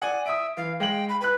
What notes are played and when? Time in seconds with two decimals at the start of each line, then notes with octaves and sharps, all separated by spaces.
0.02 D5 F#5 G#5
0.26 E5 D#6 D7
0.57 E3 F5
0.80 G#3 F5 G5 F#7
1.09 B5
1.21 B4 B5 F#6